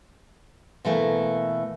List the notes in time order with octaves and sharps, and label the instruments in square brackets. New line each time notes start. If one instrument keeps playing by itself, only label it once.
[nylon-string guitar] B2 E3 A3 A#3